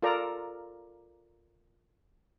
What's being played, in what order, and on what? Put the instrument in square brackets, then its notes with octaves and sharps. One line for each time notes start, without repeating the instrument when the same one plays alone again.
[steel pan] F4 A4 A#4 D5 A#5